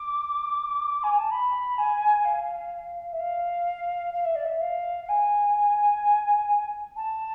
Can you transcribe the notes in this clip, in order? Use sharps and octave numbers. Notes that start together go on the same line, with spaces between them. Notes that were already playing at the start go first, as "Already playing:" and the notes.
Already playing: D6
G#5
A5
B5
G#5
F5
E5
F5
F5
E5
D5
E5
F5
F5
G#5
A5